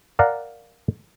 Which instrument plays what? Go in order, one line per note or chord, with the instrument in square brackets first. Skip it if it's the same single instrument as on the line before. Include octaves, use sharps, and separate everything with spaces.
[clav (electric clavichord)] A#4 D5 F5 F#5 A#5